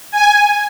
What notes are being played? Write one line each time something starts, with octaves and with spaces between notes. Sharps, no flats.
G#5